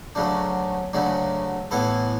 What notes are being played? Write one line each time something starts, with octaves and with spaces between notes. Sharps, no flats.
D2 C#3 F#3 A3 D4
D2 C#3 F#3 A3 D4
A2 E3 B3 E4 A4